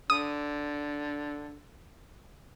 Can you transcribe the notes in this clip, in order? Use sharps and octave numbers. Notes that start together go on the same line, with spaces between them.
D3 D#6